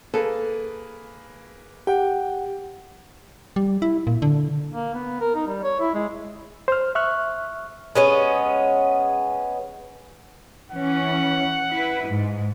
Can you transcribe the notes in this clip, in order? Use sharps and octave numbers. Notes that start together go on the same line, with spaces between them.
A#3 G#4 A4 B4
G4 F#5 G5
G3
E4
A#2
D3
A#3
B3
A#4
D#4
G3
C#5
E4
G#3
C5 F6
E5 C#6 F6 F#6
G#3 B3 C#4
E3 C#4 F#5
E4 B4
G#2